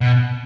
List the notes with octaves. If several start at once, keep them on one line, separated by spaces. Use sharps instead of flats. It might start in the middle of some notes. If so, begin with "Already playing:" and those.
B2